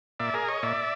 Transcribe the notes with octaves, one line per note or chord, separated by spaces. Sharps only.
A#2 D5 E5
G#4 A#4
C#5 D#5
A#2 D5 E5